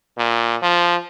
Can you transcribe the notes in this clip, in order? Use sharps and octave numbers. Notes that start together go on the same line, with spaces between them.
A#2
F3